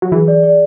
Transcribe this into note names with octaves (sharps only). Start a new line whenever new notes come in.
F#3
E3 G#4
D5
D5